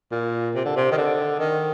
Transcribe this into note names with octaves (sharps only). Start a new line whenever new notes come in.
A#2
C3
D3
C3
D#3
D3
D#3